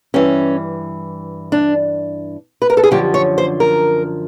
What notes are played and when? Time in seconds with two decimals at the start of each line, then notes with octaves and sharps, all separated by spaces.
0.14 G2 E3 C#4
1.52 D4
2.62 B4
2.70 A#4
2.77 A4
2.83 G#4
2.91 F#2 D3 F3 G4
3.14 C#5
3.38 C5
3.60 A#4